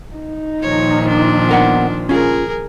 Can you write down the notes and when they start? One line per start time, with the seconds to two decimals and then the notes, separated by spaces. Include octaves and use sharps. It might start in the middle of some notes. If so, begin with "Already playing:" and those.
0.16 D#4
0.62 A#2 D#3 F3 C#5
1.08 D4
1.49 B3 A#4 F#5
2.09 C#4 F4 G#4 A#4